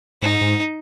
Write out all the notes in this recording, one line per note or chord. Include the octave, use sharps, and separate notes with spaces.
G#2 D#4
G#2